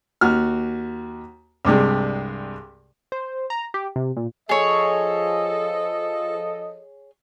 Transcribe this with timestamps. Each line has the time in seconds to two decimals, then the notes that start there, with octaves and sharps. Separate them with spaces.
0.21 D#2 F#4 F6
1.65 C2 G2 C3 G#3
3.12 C5
3.50 A#5
3.74 G4
3.96 C3
4.16 A#2
4.49 F3 G#4 A4 C#5 D#5